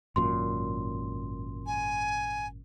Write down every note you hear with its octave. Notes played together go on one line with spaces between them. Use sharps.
G#1 F#2 A#2 C6
G#5